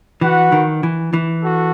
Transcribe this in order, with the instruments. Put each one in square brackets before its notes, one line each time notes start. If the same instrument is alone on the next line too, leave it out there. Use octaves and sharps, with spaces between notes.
[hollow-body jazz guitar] E3 [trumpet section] F#4 B4 F#5
[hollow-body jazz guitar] D#3
E3
E3
[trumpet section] F#4 A4